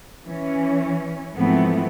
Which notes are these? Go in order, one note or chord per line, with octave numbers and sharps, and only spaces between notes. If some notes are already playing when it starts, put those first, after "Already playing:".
E3 C#4
G#2 E3 F3 A3 B3 C4